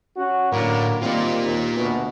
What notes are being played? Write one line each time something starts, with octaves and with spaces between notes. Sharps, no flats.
C#4 F#4
A2 D3 F#3 A#3
D#3 G3 A#3 C4 F4
D#2
D2 B2